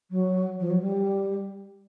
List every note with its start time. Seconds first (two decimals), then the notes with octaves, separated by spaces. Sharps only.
0.10 F#3
0.59 F3
0.70 F#3
0.81 G3